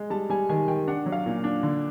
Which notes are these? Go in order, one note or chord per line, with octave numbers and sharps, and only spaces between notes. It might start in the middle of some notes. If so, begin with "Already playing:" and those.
Already playing: G#3
G3 A5
G3 G#5
D#3 G#5
D#3 G5
D4 F#5
F#3
F5
A#2
D4
D3